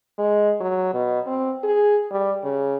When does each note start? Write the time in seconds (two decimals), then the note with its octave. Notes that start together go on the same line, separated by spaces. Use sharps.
0.18 G#3
0.60 F#3
0.94 B2
1.27 C4
1.63 G#4
2.11 G3
2.44 C#3